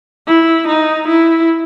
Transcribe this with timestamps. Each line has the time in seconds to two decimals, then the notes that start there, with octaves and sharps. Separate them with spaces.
0.28 E4
0.68 D#4
1.08 E4